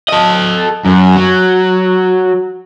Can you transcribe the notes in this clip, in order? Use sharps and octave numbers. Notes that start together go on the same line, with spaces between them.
A4 D#5
F#2
F#3